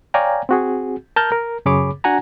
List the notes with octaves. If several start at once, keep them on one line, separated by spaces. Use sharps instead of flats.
C#5 D5 F5 G5 G#5 A#5
C4 F#4 G#4
A#4 A5 A#5 F6 G6
A#4
F#2 C#3 G#4 C#5 B5 D6
D4 F#4 F#5 G#5 A#5